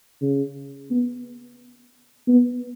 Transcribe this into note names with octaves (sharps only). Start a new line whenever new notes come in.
C#3
B3
B3